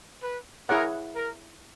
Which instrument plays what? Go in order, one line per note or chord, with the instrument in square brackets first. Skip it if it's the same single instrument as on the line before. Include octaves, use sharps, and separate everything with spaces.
[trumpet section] B4
[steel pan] E4 G#4 C#5 F#5 [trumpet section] A#4
[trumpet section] A#4